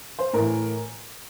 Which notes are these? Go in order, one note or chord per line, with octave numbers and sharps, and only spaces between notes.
C5
A2 E3 A#4